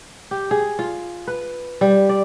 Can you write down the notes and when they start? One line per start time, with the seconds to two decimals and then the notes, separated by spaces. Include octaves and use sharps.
0.31 G4
0.51 G#4
0.79 F4
1.27 B4
1.81 G3
2.09 D5